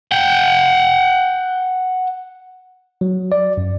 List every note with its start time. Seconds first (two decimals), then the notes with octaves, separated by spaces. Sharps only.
0.12 F#5 G5
3.01 F#3
3.32 D5
3.57 F#2